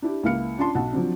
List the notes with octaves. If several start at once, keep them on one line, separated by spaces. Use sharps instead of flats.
D4 E4 G4
C#2 A#3 E4 F5 F6 C#7
C#4 D4 F4 A5 C6
B1 F#5 A5
F3 F#3 C4 D4